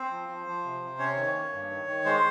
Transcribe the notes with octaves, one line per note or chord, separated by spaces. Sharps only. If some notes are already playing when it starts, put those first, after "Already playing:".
Already playing: C4 C5
F3
F3
F3
C3
C3
C#4 C#5
D#3
A#3
G2
D#3
D#3
G#3 C5